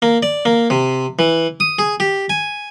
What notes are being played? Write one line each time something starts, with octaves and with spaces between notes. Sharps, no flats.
A#3
D5
A#3
C3
E3
D#6
G#4
G4
G#5